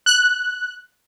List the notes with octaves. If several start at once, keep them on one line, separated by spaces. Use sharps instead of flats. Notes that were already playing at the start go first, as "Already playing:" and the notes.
F#6